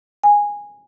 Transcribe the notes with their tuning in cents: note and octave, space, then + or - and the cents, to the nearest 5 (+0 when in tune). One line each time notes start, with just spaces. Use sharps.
G#5 -10